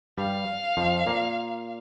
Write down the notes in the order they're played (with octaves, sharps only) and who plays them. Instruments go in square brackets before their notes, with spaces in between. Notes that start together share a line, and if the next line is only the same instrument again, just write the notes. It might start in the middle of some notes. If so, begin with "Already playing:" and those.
[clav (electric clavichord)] G2 G3 [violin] F5
[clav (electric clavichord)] F2 F3
A#2 A#3